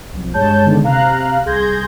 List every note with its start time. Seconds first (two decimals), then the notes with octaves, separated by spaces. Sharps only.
0.13 B1 F2
0.34 G2 G#3 C#5 A5 G6
0.65 D3 D#3 G#3 B3 D4
0.84 C3 F5 A#5 F6 F#6
1.46 C2 G#4 C6 G6 G#6 A#6